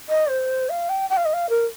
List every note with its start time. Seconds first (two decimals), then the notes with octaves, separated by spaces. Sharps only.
0.09 D#5
0.29 C5
0.69 F5
0.89 G5
1.09 G5
1.17 F5
1.25 D#5
1.33 F5
1.49 A#4